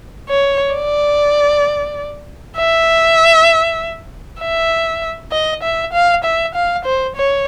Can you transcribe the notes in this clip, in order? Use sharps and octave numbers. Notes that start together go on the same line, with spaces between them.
C#5
D5
E5
E5
D#5
E5
F5
E5
F5
C5
C#5